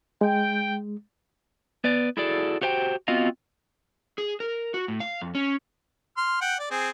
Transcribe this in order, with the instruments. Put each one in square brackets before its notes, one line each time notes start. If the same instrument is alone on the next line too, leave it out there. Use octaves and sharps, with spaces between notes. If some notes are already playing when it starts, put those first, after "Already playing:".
[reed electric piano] G#3 [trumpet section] G5
[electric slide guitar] B3 B4 D5
E4 F#4 G#4 A4 D5
F#4 G4 C5 F5 G5
B3 C4 F4 F#4 D#5 F5
G#4
A#4
F#4
A2
F5
F2
C#4
[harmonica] C6 F6
F#5 G5
D5
C4 G#4